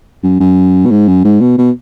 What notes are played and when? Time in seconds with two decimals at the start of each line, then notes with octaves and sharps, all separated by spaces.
0.23 F#2
0.40 F#2
0.86 B2
0.91 G#2
1.08 F#2
1.24 G#2
1.41 B2
1.58 B2